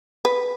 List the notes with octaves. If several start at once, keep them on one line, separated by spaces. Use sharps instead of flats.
B4